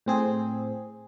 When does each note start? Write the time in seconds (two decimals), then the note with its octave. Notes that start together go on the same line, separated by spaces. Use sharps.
0.06 A2 C4 G#4